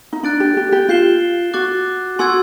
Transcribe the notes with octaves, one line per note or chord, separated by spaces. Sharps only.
D#4
D4 F#6 A6 D7
G4
G4
G4
F4 G6 C7 E7 G7
F#4 D6 F#6 A6
F#4 G#5 C6 E6 G#6